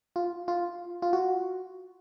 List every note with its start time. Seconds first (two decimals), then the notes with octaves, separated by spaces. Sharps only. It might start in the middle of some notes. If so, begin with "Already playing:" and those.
0.16 F4
0.48 F4
1.02 F4
1.13 F#4